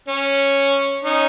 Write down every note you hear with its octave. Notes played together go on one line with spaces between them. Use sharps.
C#4
C#4 D#4